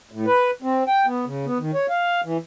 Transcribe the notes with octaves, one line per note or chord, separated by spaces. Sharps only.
A2
B4
C4
G5
B3
C#3
B3
D#3
C#5
F5
E3